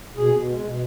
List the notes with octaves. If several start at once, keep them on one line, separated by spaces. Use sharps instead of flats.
B2 G#4
B2
G#3
B2